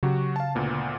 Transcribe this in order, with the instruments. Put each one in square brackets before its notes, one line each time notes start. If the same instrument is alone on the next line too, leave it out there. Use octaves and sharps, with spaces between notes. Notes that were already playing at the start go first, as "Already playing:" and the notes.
[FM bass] C#3 [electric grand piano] F#3 F#4 G4
[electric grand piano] F5 A5
D2 A#2 B3